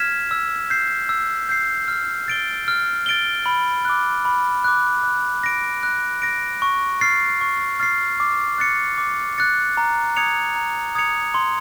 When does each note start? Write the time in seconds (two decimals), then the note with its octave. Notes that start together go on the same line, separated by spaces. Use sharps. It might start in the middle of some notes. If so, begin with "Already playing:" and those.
Already playing: F6 G#6 B6 E7
0.31 E6
0.70 G6 C7
1.09 E6
1.49 G6 C7
1.88 F6
2.28 A6 D7 G7
2.68 F6
3.06 A6 D7 G7
3.46 B5
3.85 D6 F#6
4.25 B5
4.64 D6 F#6
5.03 F#6
5.44 A#6 D7
5.83 F#6
6.22 A#6 D7
6.62 C#6
7.01 F6 A6 C7
7.41 C#6
7.80 F6 A6 C7
8.20 D6
8.58 F#6 A6 C#7
8.98 D6
9.38 F#6 A6 C#7
9.77 A#5
10.16 D#6 G#6 C#7 F7
10.56 A#5
10.95 D#6 G#6 C#7 F7
11.34 C6